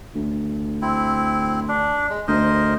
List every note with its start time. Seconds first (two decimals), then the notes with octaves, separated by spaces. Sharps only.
0.15 D2
0.82 C4 E4
1.68 D4
2.10 G#3
2.27 D2 A#4 C5 D#5